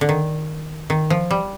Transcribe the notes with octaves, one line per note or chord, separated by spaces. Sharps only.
D3
D#3
D#3
F3
G3